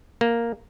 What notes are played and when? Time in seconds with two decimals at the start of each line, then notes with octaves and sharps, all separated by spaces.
0.21 A#3